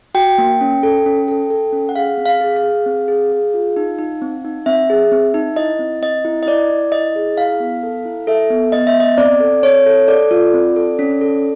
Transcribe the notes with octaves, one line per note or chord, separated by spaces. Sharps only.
F#4 G5
A#3
C#4
A4
C#4
A4
A4
C#4
F#5
G#4 F5
C4
F5
G#4
F5
G#4
C4
G#4
G#4
F4
D#4
D#4
C4
D#4
C4 E5
G#4
C4
D#4
E4 D#5
C4
C4 D#5
E4
D#5
E4 D5
E4
E4 D#5
G#4
E4 F5
B3
A4
E4
A4 E5
B3
B3 D#5
E5
B3
D#5
C4 D5
A4
C4 C#5
A4
A4 D5
F4
C4
A4
C#4
A4